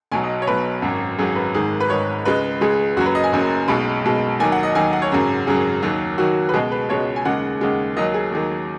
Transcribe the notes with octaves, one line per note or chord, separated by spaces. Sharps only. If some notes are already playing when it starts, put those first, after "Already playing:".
B1 B2 F#3 G#5
D#5
C#5
B1 B2 F#3 B4
G#1 F#2 F#3
G#1 F#2 F#3 G#4
B4
G#1 G#2 D#3 G#4
B4
G#1 G#2 D#3 C#5
C#2 C#3 G#3 B4
C#2 C#3 G#3 G#4
F#1 F#2 F#3 F#4
B4
D#5
G#5
F#1 F#2 F#3
B1 B2 G#3 B5
B1 B2 G#3
D#2 D#3 F#3 G#5
F#5
D#5
D#2 D#3 F#3 G#5
F#5
C#5
G#1 F#2 C#3 F#3
G#1 F#2 C#3 F#3 G#4
D#2 D#3 F#3
D#2 D#3 F#3 F#4
B4
C#2 B2 G#3 G#4
B4
C#2 B2 G#3 C#5
G#5
D#2 C#3 G#3 F#5
D#2 C#3 G#3
D#2 D#3 F#3 D#5
G#4
D#2 D#3 F#3 G#4